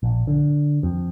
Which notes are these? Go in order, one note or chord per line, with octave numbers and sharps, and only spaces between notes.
A#1
D3
F2